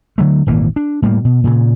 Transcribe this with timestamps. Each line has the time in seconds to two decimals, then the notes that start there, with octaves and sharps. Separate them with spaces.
0.18 D3 F#3 A3
0.46 D#1 G#1 E3 A#3
0.76 D4
1.02 A2 G3 A#3
1.25 B2
1.44 A#2 C#3